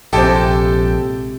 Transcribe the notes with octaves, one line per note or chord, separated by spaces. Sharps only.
A#1 C3 G#3 E4 G4 A4 G5 A5